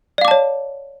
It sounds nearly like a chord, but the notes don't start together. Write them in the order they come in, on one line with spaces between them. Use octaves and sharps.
D5 F5 D6 A5 C#5